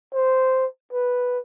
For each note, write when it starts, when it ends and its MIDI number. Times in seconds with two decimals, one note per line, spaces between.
0.13 0.66 72
0.93 1.39 71